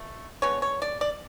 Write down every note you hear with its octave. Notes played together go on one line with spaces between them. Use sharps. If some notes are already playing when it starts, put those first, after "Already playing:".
Already playing: B2 A3
D3 G#3 B3 C#5
C#5
D5
D5